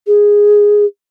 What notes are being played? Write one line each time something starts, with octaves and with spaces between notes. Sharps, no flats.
G#4